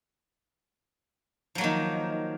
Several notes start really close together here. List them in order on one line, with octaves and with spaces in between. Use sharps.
F3 F#3 A#3 D#3